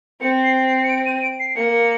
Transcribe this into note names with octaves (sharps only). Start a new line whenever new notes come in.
C4 C#7
C7
C7
C#7
D7
D#7
D7
C7
A#3 C#7